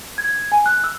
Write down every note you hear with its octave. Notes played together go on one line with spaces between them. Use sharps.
G#6
G#5
F#6
E6